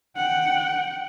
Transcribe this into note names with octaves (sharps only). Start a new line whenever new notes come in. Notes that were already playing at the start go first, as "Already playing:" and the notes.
F#5 G5